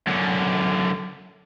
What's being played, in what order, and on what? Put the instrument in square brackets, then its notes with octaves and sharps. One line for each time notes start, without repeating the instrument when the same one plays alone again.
[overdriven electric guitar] F#2 D3